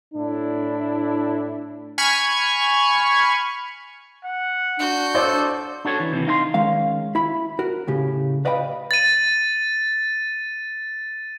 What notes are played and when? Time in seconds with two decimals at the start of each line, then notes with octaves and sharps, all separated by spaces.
0.14 A2 D4 E4
1.98 G#5 B5 C#6 F6 G#6
4.25 F#5
4.79 D4 F#4 G6
5.15 A4 C5 D5 C6
5.85 D4 F#4 A4 C#5
6.00 E3
6.12 D#2 C3 D#3 E3
6.26 D#4 F5 G5 C6
6.54 D#3 G#3 C#4 F5
7.15 E4 B5
7.59 F#4 A#4
7.87 A2 C#3 G4
8.45 B4 D5 D#5 F5 G5 B5
8.91 A6 D#7